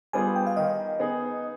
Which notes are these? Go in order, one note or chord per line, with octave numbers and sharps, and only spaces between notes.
G3 B3 F4 G#4 G#5
G5
F5
D#3 D#5
B3 D#4 G#4